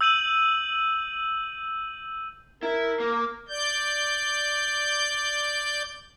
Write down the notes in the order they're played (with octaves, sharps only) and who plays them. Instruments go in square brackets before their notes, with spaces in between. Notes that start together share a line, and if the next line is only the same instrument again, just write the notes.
[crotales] E6 G6 D#7 F#7
[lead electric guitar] E4 [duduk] A#4
[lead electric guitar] A#3
[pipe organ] D5 G6